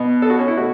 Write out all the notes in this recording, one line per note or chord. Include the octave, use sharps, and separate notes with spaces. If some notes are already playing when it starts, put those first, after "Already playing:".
Already playing: B2 B3
A4
F#4
C#4
E4
B2 A3 F#4